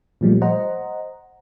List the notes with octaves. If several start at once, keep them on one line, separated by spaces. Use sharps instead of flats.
A#2 F3 G3 A3
C5 D#5 F#5 A#5